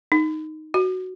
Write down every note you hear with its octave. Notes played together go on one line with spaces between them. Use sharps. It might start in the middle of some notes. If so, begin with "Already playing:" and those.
D#4
F#4